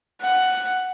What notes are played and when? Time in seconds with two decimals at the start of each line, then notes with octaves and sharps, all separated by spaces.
0.22 F#5